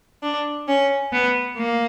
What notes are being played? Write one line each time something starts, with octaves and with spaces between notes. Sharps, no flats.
D4
C#4
B3
A#3